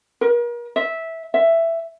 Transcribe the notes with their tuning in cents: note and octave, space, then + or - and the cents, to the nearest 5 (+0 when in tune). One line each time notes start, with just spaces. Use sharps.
A#4 +40
E5 -10
E5 +10